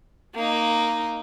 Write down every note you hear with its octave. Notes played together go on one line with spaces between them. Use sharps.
A#3 D#4